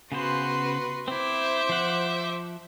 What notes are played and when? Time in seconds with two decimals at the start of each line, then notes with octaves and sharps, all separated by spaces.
0.12 C#3 B3 F#4 B4 C5 C6
1.08 C4 E4 C5 E5 D6
1.69 F3 F#5